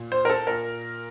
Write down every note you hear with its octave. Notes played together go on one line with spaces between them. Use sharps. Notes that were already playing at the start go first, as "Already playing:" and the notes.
Already playing: A#2
C5
A#4
A4
A#2 A#4